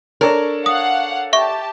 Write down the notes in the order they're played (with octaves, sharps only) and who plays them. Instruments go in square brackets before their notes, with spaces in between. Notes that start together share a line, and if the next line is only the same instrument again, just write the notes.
[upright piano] D4 A4 C#5 [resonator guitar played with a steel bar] A#4
[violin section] F5 F#5 [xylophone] D#6
[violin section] G4 A5 [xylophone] E5 C#6